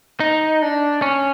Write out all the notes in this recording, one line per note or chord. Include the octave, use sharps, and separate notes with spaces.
D#4
D4
C#4